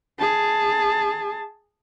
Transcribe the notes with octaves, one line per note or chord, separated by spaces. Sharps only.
G#4 A5